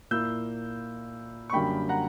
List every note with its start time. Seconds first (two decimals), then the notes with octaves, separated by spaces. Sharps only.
0.11 A#2 A#3 E4 E6 G6
1.50 C#6
1.53 F#2 D3 G3 A#3 G5 B5
1.89 F#5 A#5